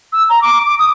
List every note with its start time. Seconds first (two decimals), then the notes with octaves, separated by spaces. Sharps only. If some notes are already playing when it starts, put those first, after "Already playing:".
0.13 E6
0.29 A#5
0.41 D6
0.66 D6
0.79 D#6